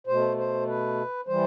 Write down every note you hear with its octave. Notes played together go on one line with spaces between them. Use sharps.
B2 A3 C5
C5
B4
E3 G3 C5